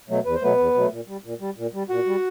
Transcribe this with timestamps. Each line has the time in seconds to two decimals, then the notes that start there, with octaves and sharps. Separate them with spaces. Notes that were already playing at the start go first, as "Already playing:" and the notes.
0.09 B2 F#3 A3
0.25 E2 B4
0.34 C5
0.42 B2 F#3 A3 B3 B4
0.58 E2
0.74 B2 F#3 A3
0.91 A#2
1.07 G3
1.24 A#2
1.40 G3
1.57 A#2
1.73 G3
1.89 A#2 F#4 F#5
2.06 G3